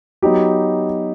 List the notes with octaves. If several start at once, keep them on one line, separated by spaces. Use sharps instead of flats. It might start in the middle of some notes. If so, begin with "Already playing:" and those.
F#3 B3 D#4 G4